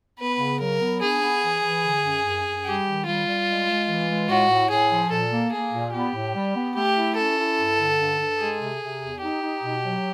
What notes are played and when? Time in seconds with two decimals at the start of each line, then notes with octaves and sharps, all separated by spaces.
0.19 B3 B4
0.39 C#3
0.60 F#3 A#4
0.80 B3
1.01 D4 G#4
1.21 B3
1.42 E3
1.62 E3
1.83 D3
2.04 F#2
2.24 F#2
2.45 F#2
2.65 G3 G4
2.85 D#3
3.06 G3 F4
3.27 G3
3.47 G#3
3.68 G#3
3.88 E3
4.08 G#3
4.29 A2 F#4
4.49 A2
4.70 A2 G#4
4.91 F3
5.11 A#2 A4
5.31 A#3
5.52 A#3 G#4
5.72 A#2
5.93 B3 G4
6.14 A2
6.35 G3
6.55 B3
6.75 A3 G4
6.96 E4
7.16 C#4 A4
7.37 E4
7.57 G2
7.77 D3
7.98 G2
8.19 G2
8.39 G#3 G#4
8.60 C3
8.81 C3
9.00 E2
9.21 D#4 G4
9.42 D#4
9.63 B2
9.83 F#3